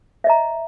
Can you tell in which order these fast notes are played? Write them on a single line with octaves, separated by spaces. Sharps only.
E5 D#5 A#5